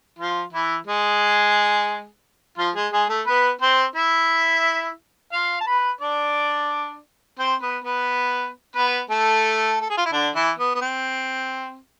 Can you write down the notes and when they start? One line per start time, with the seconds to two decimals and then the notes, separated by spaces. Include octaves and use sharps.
0.18 F3 F4
0.52 E3 E4
0.86 G#3 G#4
2.58 F3 F4
2.75 G#3 G#4
2.92 G#3 G#4
3.09 A3 A4
3.26 B3 B4
3.61 C4 C5
3.95 E4 E5
5.33 F4 F5
5.60 A5
5.67 B4 B5
6.01 D4 D5
7.39 C4 C5
7.62 B3 B4
7.84 B3 B4
8.75 B3 B4
9.10 A3 A4
9.81 A4
9.90 G#4
9.97 F4
10.06 E4
10.12 D3 D4
10.35 E3 E4
10.59 B3
10.75 B3
10.81 C4